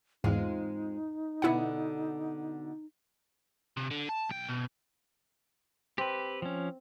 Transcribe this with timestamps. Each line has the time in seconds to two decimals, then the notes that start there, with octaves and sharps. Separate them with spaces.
0.24 E2 G#2 G#3 C4 D#4 F4
1.42 B2 D3 B3 E4 F#4 F#5
3.77 C3
3.91 D3
4.09 A5
4.29 B1 G5
4.48 B2
5.98 C4 G4 B4
6.42 F3 C#4